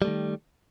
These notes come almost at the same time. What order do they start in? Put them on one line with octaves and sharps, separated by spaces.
G3 A3 D#3